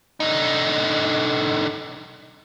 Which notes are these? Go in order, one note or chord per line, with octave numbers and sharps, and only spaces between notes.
D3 D#4